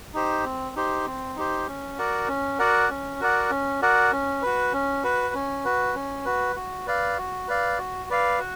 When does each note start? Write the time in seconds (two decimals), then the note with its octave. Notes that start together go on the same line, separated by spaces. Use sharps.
0.14 D#4 G4 C5
0.44 C4
0.76 D#4 G4 C5
1.06 C4
1.36 D#4 G4 C5
1.68 C#4
1.98 F#4 A#4 D5 F#5
2.28 C#4
2.59 F#4 A#4 D5 F#5
2.90 C#4
3.20 F#4 A#4 D5 F#5
3.50 C#4
3.82 F#4 A#4 D5 F#5
4.12 C#4
4.42 F#4 B4
4.73 C#4
5.03 F#4 B4
5.34 C#4
5.65 F#4 B4
5.95 C#4
6.25 F#4 B4
6.56 F#4
6.87 B4 D5 F5
7.18 F#4
7.48 B4 D5 F5
7.78 F#4
8.10 B4 D5 F5
8.39 F#4